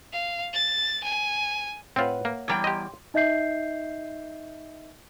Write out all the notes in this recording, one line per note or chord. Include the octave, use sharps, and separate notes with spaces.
F5
A6
G#5
A2 C4 F4 B4 C#5 E5 F#5
A#3
E2 G3 G5 A#5 D6 G#6
G4 D#5 C6
D#4 D#5 E5 G6 C7